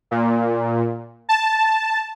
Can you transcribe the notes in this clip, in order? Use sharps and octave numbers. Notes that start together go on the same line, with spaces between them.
A#2
A5